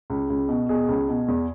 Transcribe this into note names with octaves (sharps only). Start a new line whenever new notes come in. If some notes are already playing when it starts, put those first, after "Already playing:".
C#2
C#2
B2
B2 G#4
C#2
B2
E2